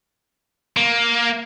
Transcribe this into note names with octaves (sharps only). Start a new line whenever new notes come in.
A#3